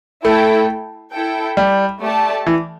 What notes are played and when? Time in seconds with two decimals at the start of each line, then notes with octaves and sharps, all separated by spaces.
0.25 A3 E4 A4 G5
1.14 E4 A4 G5
1.57 G3
2.02 A3 G4 D5 A5
2.46 E3